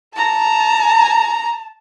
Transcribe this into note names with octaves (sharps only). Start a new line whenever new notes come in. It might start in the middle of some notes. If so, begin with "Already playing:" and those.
A5 A#5